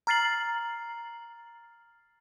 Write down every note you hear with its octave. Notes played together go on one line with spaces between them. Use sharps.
A#5 F6 A6 C7 F#7